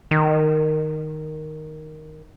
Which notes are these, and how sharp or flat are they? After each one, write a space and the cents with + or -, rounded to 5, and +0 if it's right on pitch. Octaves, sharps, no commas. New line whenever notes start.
D#3 -5